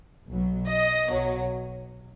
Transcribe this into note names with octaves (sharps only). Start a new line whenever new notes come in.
B1 B2 F#3
D#5
B1 B2 F#3